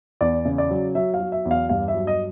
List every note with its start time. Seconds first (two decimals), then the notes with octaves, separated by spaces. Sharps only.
0.21 E2 D5
0.45 C#3
0.58 D5
0.70 F#3
0.95 F#3 E5
1.14 F5
1.20 F#3
1.32 E5
1.45 E2
1.51 F5
1.69 G2 F5
1.88 E5
1.94 F#3
2.07 D#5